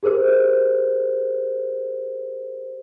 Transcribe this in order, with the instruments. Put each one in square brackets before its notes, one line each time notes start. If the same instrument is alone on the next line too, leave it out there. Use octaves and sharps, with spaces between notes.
[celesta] G4 G#4 A#4 C5